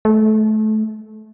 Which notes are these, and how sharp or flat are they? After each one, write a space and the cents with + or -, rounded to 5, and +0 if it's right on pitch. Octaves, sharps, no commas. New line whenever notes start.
A3 -25